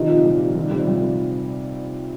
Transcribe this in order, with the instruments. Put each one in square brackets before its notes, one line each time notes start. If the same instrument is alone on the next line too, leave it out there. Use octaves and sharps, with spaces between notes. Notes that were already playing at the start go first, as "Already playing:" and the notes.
Already playing: [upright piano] C3 D#3 F3 D#4
A#2
A#2 G3
F3
D#3 G3
C3 G3
C3 G3